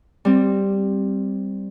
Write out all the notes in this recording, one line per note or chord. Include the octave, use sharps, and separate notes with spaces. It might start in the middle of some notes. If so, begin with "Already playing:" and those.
G3 C4